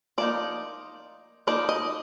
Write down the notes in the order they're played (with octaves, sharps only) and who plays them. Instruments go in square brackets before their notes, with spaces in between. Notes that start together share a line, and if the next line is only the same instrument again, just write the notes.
[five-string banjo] F3 A#3 D#4 D5
F3 A#3 D#4 D5
D#5